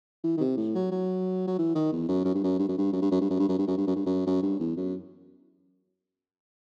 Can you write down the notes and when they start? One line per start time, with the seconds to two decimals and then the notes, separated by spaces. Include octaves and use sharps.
0.24 E3
0.37 D#3
0.40 C3
0.57 A2
0.75 F#3
0.91 F#3
1.47 F#3
1.58 E3
1.75 D#3
1.92 E2
2.09 F#2
2.25 F#2
2.35 G2
2.44 F#2
2.59 G2
2.68 F#2
2.78 G2
2.93 F#2
3.02 G2
3.11 F#2
3.21 G2
3.30 F#2
3.39 G2
3.49 F#2
3.59 G2
3.67 F#2
3.78 G2
3.87 F#2
3.96 G2
4.06 F#2
4.27 F#2
4.43 G2
4.59 E2
4.77 F#2